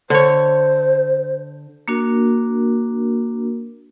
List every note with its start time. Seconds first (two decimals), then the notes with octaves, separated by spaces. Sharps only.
0.10 D3 C5 C#5
1.88 A#3 D4 F#4 A#4